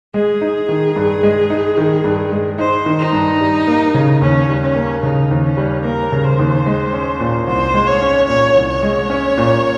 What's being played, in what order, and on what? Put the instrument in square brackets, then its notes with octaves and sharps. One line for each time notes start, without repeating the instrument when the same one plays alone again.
[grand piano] G#3 [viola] G#4
[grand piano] D#4
D#3
G2
G#3
D#4
D#3
G2
G#3
[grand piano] D#4 [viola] C5
[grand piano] D#3
[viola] D#4
[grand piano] G2
G3
A#3
C#3
[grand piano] D#2 [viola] C#4
[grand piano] G3
[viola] C#4
[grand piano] A#3
[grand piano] C#3 [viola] D#4
[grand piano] D#2
[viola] C#4
[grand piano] G3
[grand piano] A#3 [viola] A#4
[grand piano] C#3
[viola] C5
[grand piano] D#2
G#3
C#4
A#2
[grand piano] C2 [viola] C5
[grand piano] G#3
[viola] C#5
[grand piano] C#4
[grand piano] A#2 [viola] C#5
[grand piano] C2
[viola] C#5
[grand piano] G#3
C#4
A#2